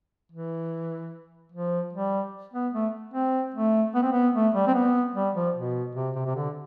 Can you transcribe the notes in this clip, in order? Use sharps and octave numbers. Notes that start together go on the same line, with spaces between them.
E3
F3
G3
B3
A3
C4
A3
B3
C4
B3
A3
G3
C4
B3
G3
F3
B2
C3
C3
C3
D3